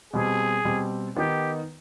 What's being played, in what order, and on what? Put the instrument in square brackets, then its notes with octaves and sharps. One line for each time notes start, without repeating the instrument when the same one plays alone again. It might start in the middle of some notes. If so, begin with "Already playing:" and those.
[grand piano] B2 G3 C4 [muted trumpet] G#4
[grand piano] B2 G3 C4
[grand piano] D#3 B3 D#4 [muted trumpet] G4